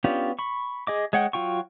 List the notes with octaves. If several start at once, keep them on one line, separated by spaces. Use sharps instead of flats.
B3 C#4 D4 F4 G4
B5 C#6
G#4 D#5 D6
G#3 C#5 F#5 G5
F#3 F4 G5 C#6